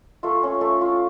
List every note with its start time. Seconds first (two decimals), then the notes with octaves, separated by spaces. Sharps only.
0.23 A3 F4
0.43 C#4
0.61 A3
0.81 F4